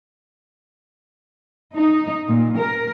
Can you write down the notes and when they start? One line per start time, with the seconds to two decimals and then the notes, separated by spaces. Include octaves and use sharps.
1.75 D#4
2.28 A#2
2.57 A#4